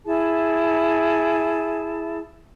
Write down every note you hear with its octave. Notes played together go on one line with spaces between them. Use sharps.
E4 G#4 A5